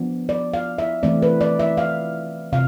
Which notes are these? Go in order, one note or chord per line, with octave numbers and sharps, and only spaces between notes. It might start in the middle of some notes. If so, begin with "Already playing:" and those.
Already playing: F3 B3 D4
D5
F5
E5
E3 A3 C4 D5
B4
D5
E5
F5
C3 F5